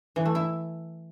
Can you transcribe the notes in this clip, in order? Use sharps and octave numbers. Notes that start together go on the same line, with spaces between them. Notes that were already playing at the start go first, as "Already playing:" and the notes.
E3
A3
E4